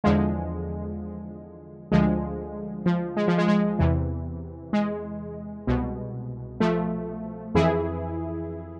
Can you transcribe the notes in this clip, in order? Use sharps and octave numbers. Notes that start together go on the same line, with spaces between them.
E2 D3 F3 G#3
D2 D3 F3 G#3
F3
G#3
F3
G#3
G#3
E2 C3 E3
G#3
C2 B2
F3 A3
F2 E3 E4 G#4